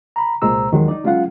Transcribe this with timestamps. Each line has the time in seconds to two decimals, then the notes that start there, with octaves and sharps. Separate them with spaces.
0.16 A#5 B5
0.42 C2 A#2 G#3 C5 A#5 E6
0.72 D#2 D#3 E3 F#3 G#3
0.88 D#4 D5
1.04 F#3 G#3 C#4 F4 F5 F#5